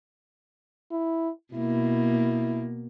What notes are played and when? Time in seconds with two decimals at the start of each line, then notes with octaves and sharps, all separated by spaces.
0.91 E4
1.54 B2 A#3 E4